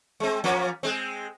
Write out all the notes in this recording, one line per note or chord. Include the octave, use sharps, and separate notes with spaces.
G#3 C4
F3 A#3 C#4
G#3 C4